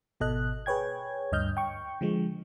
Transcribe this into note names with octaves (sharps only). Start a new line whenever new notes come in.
G#1 B2 A4 D#5 F#6
G#4 B4 C#5 G5 G#6
D2 G2 D#5 F6 G6
G5 C#6
D3 F3 G#3